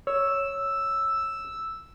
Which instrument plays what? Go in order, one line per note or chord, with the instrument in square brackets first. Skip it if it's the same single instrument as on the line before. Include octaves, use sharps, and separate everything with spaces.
[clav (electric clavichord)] C#5 [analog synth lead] E6